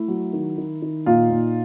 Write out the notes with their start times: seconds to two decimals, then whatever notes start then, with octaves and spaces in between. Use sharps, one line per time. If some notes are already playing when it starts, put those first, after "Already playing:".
Already playing: A3 E4
0.08 F#3
0.33 D#3
0.58 D#3
0.82 D#3
1.06 A#2 D#4 F4
1.30 A#2